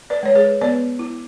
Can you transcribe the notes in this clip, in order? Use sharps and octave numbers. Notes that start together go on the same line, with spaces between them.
B4 D5
G#3 C#5
G#4 B4
B3 B4 D5
E4